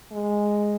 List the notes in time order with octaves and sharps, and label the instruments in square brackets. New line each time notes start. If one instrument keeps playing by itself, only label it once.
[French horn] G#3